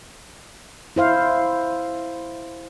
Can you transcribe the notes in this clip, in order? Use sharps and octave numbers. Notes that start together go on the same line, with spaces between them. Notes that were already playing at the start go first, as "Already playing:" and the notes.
E4 C5 F5